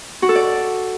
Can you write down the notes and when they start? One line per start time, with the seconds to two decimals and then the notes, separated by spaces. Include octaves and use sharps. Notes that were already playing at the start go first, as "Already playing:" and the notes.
0.22 F#4
0.29 A4
0.35 D5